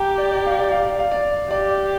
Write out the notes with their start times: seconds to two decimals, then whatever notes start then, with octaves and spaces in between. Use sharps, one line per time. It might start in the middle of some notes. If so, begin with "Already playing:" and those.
Already playing: G4 G5 A#5
0.18 D5
0.32 D5
0.46 F5
0.59 D5
0.71 F5
0.85 D5
0.99 F5
1.12 D5
1.50 G4 D5